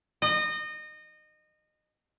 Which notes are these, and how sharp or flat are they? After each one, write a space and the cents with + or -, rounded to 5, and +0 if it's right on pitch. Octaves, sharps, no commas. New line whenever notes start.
D#5 -25